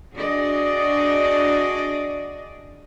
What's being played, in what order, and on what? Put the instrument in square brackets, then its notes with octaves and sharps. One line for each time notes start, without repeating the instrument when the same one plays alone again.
[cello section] D4 F#4 G#4 D5 D#5